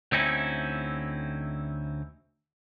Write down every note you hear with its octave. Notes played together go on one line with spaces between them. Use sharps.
D2 C4 C#4 D#4 E4